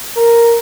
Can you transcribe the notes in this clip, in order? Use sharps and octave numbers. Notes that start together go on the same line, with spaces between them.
A#4